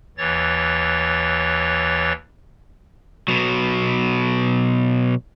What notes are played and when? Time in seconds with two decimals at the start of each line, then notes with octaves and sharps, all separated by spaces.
0.17 D#2 E3 C#5 A6
3.28 B2 F#3